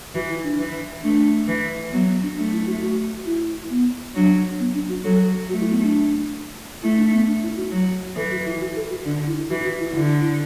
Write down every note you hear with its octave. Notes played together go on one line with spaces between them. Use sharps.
E3 F#4
E4
D4
E3
A3 D4
E3
F#3 B3
B3
D4
A3 D4
E4
F#4
F#4
E4
B3
F#3 D4
B3
D4
F#4
F#3 A4
A3 F#4
E4
B3
D4
A3 E4
D4
B3
D4
E4
F#4
F#3
E3 A4
F#4
E4
F#4
A4
F#4
D3 D4
E4
E3 F#4
F#4
E4
D3 E4